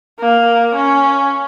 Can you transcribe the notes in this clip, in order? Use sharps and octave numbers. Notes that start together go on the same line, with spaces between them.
A#3
C#4